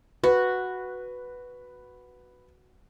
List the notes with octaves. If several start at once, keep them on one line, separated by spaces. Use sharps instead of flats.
F#4 B4